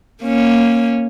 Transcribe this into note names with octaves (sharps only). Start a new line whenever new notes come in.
A#3 C#4